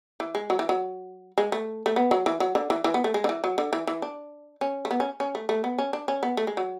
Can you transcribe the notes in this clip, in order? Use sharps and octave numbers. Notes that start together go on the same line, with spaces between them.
E3
G#3
F#3
E3
F#3
G#3
A3
A3
B3
F#3
E3
F#3
D3
E3
E3
B3
A3
G#3
D3
E3
F#3
D3
E3
E3
D4
C#4
A3
B3
C#4
C#4
A3
A3
B3
C#4
D4
C#4
B3
A3
G#3
F#3